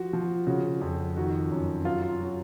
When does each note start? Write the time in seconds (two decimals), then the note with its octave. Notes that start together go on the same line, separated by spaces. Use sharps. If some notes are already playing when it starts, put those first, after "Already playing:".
Already playing: F3 F#4
0.13 F3
0.47 C#3 F#4
0.81 F2
1.17 D#3 F#4
1.51 F#2
1.85 F#3 F4
2.02 F4
2.20 F#3 F#4